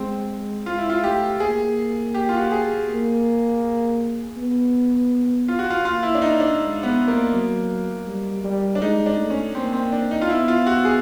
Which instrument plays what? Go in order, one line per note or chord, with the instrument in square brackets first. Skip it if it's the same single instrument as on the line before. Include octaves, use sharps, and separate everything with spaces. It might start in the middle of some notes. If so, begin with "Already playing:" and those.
Already playing: [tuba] G#3 [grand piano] C4
[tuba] G#3 [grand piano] F4
[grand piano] E4
F4
[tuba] A3 [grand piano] G4
[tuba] A#3 [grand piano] G#4
[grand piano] G4
F4
F#4
G4
G#4
[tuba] A#3
B3
[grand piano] F4
F#4
F4
[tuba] A#3 [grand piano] F4
[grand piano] E4
D4
D#4
D4
[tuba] G#3
[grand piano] B3
A#3
[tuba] F#3
G3
G3
[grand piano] D4
[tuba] G#3 [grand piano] D#4
[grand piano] D4
[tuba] A3
[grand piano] C#4
[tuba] A#3 [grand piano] C4
[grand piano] C4
D4
D#4
F4
[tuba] B3 [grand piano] E4
[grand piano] F4
F#4
G#4